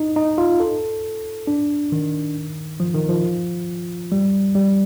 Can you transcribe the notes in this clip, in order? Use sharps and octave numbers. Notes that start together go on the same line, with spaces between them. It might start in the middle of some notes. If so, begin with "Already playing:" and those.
Already playing: D#4
D#4
F4
A4
D4
D#3
F3
D#3
F3
G3
G3